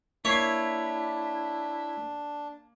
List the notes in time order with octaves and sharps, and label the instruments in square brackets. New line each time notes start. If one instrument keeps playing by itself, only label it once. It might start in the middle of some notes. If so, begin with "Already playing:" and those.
[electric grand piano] A#3 B6 C7 [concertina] D4 [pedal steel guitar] E4 [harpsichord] C#5